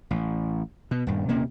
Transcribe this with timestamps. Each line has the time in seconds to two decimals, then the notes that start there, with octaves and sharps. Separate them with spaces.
0.11 A1
0.91 B2
1.07 D#1 G2
1.29 D#1 C3 A#3 C#4